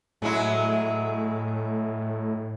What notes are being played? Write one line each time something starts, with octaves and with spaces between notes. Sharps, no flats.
A2 F#3 G#3 E4